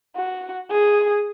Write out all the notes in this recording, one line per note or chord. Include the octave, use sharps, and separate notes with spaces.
F#4
G#4